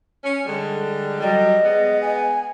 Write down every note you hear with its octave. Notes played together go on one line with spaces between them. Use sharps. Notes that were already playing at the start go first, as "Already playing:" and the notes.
C#4
D3 G3 G#3
F#3 G3 D#5
G#3 B3
G#5